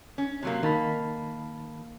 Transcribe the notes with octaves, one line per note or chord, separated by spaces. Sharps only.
C#4
C3 F#3 A#3
D#3 A#3 A5 B5